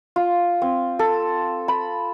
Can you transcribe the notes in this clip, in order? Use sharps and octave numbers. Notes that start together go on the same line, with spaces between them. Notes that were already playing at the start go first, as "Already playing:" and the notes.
F4
C4
A4
B5